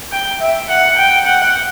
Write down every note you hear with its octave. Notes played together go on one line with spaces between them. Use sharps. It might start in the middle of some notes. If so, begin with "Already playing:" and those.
G5
E5
F#5
G5
F#5